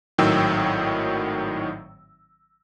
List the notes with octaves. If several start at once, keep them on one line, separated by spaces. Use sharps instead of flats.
G#1 A2 D#3 F#3 G5 E6